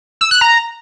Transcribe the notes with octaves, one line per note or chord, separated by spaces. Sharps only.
E6
F#6
A#5